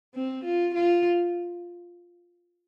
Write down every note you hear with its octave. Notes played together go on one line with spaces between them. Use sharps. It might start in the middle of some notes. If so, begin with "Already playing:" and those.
C4
F4
F4